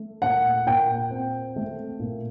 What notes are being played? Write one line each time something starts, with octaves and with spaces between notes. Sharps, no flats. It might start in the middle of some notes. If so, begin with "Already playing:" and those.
Already playing: A3
A#2 F#5
A#2 G5
C4
A3
A#2